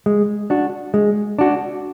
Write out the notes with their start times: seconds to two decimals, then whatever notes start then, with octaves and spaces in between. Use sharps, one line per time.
0.06 G#3
0.50 D4 F#4
0.94 G#3
1.39 D4 F#4